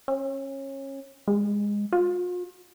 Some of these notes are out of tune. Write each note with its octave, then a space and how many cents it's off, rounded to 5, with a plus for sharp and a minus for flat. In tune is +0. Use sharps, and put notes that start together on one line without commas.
C#4 -25
G#3 -15
F4 +40